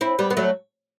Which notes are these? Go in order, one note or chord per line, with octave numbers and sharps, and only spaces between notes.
C4 E4
G3 B3
B3
F#3 A3